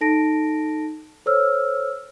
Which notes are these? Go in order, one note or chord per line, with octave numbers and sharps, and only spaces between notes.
D#4 A4 A5 A#6 D7
A4 C5 C#5 E6 F6